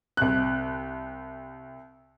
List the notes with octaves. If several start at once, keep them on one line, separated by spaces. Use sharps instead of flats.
C2 F#6